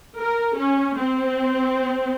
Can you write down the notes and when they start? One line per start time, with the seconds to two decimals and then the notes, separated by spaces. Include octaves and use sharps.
0.17 A#4
0.56 C#4
0.96 C4